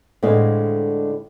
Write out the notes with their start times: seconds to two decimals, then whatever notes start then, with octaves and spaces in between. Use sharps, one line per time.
0.23 A2 D3 G#3 C4 D#5 F5